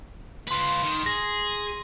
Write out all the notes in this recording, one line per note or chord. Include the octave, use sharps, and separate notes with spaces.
F4 B4 C6 F#7
D#3
G#4 A#6